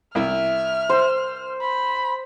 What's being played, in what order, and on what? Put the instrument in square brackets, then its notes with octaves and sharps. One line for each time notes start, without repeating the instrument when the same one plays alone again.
[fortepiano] C2 E4 [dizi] E5 [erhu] F6
[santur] C5
[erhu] B5 [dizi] C6